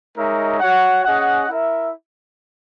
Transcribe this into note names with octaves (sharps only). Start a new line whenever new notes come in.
G#3 D#4 A#4 C#5 E5
F#4 C#5 F#5
C#4 G#4 D#5 F#5
E4 A#4 E5